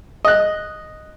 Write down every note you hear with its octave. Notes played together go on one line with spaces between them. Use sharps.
D#5 F#6